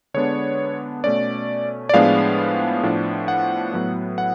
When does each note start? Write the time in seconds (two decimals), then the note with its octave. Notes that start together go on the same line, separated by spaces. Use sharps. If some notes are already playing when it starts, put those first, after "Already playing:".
0.14 D3 G#3 B3 D4 C#5
1.04 B2 A3 C#4 D5
1.89 D5
1.94 A2 F3 G#3 B3 D4 F5
2.83 A2 F3 B3 D4
3.28 F#5
3.73 A2 F#3 B3
4.18 F#5